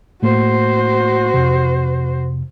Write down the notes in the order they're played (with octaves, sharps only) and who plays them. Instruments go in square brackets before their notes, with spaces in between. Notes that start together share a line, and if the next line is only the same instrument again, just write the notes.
[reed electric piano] A2 A3 A#3 [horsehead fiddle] F#4 C5
[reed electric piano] F2 C3